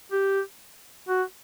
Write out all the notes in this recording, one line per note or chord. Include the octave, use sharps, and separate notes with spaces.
G4
F#4